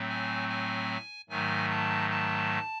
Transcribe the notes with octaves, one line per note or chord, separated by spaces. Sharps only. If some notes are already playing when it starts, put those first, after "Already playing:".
Already playing: A2 F#3 A3 C4
G#5
G#5
G#2 D#3 F#3 A3 G#5
A5
A5